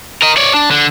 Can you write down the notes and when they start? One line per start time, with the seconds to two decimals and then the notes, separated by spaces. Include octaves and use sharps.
0.22 A#4 D#5
0.37 C#5 D5
0.54 D4
0.71 D3